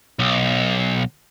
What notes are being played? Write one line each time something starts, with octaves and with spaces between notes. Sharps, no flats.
B1